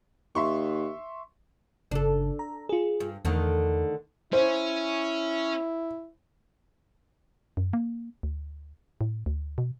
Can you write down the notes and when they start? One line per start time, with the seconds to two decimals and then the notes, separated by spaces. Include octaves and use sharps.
0.35 D#2 E5 C6 C#6
1.91 G1 C#3 D4 A4
2.39 A#5
2.69 F4 G#4
3.00 G2
3.25 E2 D3 D#3 A3
4.33 C#4 E4 C5
7.57 F#2
7.73 A#3
8.23 D2
9.01 A2
9.26 D2
9.58 B2